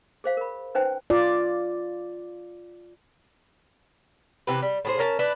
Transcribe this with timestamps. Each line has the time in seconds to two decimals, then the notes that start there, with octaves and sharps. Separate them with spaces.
0.24 G#4 C5 F5
0.37 A#4 B5
0.75 C#4 D#4 B4 C5 G5 G#5
1.10 F4 D5
4.47 C3 E3 G4 B4
4.62 G3
4.85 A2 G#4 C5
4.99 C#4 A#4 A5
5.19 D4 B4 E5